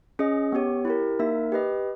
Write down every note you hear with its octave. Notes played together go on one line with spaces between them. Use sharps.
C#4 G#4 D#5
B3 G4 C#5
E4 G4 A#4
A#3 D#4 A#4 E5
G4 B4 D#5